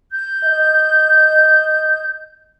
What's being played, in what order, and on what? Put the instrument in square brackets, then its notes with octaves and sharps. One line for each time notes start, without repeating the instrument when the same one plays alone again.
[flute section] G6
[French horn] D#5